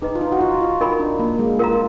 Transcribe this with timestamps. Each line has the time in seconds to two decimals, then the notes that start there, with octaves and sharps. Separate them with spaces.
0.02 D#4 G#4 B4 D#5 A#5
0.15 F4
0.21 D#4
0.32 F#4
0.41 F4
0.61 F4
0.81 D#4 A#4 D#5 G#5 B5
1.00 D4
1.19 A#3
1.39 G#3
1.59 F4 A#4 F5 A#5